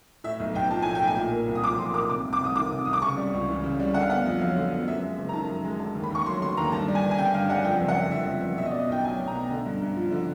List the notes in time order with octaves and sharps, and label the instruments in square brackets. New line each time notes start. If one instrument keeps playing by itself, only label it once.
[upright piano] A2 E5
B1
B1 G5
F3 A5
A2 G#5
G5
B1
G#5
A#2
A#3
C2
D#6
F3 D6
A#2 C6
A#3 D6
C3 D6
C2
D6
C2 D#6
D#3 D6
C3
C2 D#6
D6
C#3 C#6
G3
C#2
E3
C#3
G3
D3 F#5
F5
B3 F#5
F2
F#3 F5
D3
B3
F#2 E5
G#3
F#1
A#5
D#3 A5
F#2
G#3
D3 A5
D#2
B5
D#2 C#6
F#3 C6
D3 C6
D#2 A#5
G2 A5
G3
G#5
G1
G#5
D3 G5
G2 F5
G3 F#5
F2 G5
F#1
F#5
F#1
D3 E5
F2
F#1
B2 E5
D#5
B3 D5
D#5
B1 G5
F#3 G#5
B2
A#5
B3
D3
G2
G2
F3
D3